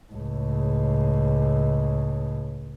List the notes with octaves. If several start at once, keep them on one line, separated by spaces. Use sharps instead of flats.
C#2 A2